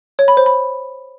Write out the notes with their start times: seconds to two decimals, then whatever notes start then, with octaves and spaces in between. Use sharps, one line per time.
0.19 C#5
0.28 B5
0.37 C5
0.46 B5